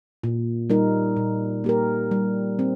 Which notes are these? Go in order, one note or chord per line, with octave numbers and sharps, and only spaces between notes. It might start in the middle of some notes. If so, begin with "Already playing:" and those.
A#2
G3 D#4 A#4
A#2
A#3 G4 A#4
G3
C4